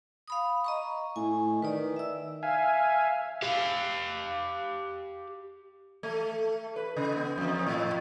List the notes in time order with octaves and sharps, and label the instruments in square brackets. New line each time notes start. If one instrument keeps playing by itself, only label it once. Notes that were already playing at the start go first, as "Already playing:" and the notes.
[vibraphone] F5 B5 D#6
D#5 A#5 C#6
[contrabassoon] A2 [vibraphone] G#5
[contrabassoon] D#3 [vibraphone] B4 D5
[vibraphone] E5 E6
[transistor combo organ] E5 F5 G#5
[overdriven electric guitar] G4 F5
[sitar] A3
B4
C#3
B3
F2
A2